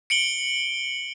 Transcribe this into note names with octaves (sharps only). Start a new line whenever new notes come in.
C#7 D7 F#7 G7